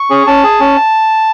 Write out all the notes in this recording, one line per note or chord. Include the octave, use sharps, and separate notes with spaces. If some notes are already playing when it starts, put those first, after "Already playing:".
Already playing: C#6
C#4 G#4
C#4 A5
G#4
C#4